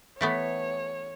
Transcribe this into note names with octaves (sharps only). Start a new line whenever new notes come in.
E3 A3 B3 C#5